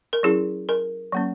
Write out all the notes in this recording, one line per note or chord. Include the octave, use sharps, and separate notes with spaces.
A#4
F#3 C#4 E4 G#4
A#4
F#3 A#3 C#4